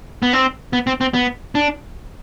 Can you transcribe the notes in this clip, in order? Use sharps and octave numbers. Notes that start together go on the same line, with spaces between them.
B3
C4
B3
C4
C4
B3
D4